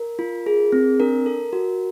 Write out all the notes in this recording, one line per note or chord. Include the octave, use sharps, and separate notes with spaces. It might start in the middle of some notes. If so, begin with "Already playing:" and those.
Already playing: A#4
F4
G#4
C4
D4 A#4
A4
F#4